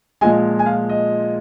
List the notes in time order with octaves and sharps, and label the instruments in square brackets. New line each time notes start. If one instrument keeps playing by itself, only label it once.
[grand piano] A#2 F3 G#3 D#5 G#5
G#5
F5
D#5